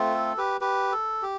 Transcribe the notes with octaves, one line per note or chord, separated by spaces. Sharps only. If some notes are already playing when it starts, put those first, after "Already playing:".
Already playing: A3 C4 F4
A4
G4 B4
G4 B4
A4
G4